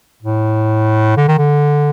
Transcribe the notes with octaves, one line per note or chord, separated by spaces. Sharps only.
A2
D3
D#3
D3